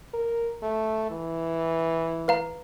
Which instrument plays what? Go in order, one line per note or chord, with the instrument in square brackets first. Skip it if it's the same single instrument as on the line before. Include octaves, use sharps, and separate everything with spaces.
[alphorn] A#4
A3
E3
[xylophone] B4 F5 A#5